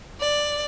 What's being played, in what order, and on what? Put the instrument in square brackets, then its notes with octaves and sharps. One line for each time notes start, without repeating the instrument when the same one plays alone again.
[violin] D5